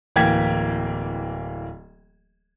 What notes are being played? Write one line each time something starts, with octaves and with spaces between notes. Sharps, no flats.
D1 E3 A#3 G5 G#6 B6